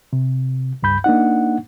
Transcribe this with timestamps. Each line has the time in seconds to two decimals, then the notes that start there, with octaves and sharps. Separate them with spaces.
0.13 C3
0.83 C#2 G2 B5 G6
1.04 A#3 D4 D#4 F#5